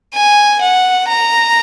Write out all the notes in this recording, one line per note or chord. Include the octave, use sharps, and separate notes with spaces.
G#5
F#5
A#5